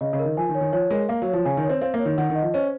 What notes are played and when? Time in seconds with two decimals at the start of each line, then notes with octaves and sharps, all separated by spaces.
0.01 C#3 D#5
0.13 C#3
0.19 A#4
0.25 D#3
0.37 F3 G#5
0.49 D#3
0.55 C#5
0.61 D#3
0.72 F3 C#5
0.91 G#3 A#4
1.09 A#3 F5
1.22 F#3
1.27 C#5
1.33 F3
1.45 C#3 G#5
1.57 D#3
1.63 C#5
1.69 C4
1.81 C4 F5
1.94 A#3
1.99 C#5
2.06 D#3
2.18 D#3 F#5
2.30 D#3
2.35 D#5
2.42 F3
2.54 C#4 C5